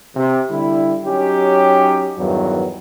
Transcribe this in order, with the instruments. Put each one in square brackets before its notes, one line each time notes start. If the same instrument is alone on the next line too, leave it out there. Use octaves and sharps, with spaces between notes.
[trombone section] C3
D3 G3 E4
F#3 C#4 D#4 G4
E2 G2 D#3 E3 F#3